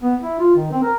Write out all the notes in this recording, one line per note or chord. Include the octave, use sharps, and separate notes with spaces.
B3
E4
F4
D#3
C4
A#4